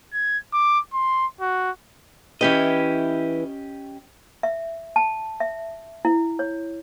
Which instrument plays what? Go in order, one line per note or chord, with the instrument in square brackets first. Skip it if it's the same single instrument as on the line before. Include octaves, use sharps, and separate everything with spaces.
[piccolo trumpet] G#6
D6
C6
F#4
[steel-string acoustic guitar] E3 E4 B4 [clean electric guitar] C#4 G4 D#5
[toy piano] E5
A5
E5
E4
C#5